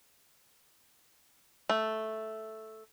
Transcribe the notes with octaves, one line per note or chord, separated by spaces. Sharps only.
A3